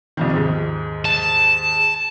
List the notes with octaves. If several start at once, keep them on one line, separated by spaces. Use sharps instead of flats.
C2 F2 D#3
D#2 G#2
A5